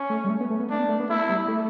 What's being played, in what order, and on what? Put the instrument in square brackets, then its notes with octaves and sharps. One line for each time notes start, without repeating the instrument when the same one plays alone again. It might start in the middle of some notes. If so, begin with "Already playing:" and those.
Already playing: [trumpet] C#4
[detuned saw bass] A3
G3
A3
B3
A3
B3
[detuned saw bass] A3 [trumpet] D4
[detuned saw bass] B3
A3
B3
[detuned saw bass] A3 [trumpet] E4
[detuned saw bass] G3
A3